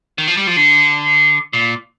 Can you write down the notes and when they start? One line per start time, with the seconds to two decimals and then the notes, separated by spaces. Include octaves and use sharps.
0.18 D#3
0.27 F3
0.37 G3
0.47 F3
0.57 D3
1.53 A#2